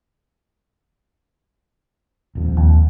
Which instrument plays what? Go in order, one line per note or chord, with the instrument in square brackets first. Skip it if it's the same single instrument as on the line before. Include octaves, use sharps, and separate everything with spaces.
[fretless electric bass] D#1 F2
[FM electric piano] D#2